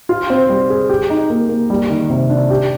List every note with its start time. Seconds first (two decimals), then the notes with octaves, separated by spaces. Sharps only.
0.09 F4
0.30 C4
0.50 G3
0.70 G#4
0.89 G4
1.10 D#4
1.30 A#3
1.49 A#3
1.70 G3
1.90 D#3
2.10 C3
2.30 D4
2.50 G4